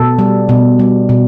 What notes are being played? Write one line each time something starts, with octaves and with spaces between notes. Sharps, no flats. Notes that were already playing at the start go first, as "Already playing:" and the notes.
Already playing: B2 A4
G3
B2
G3
B2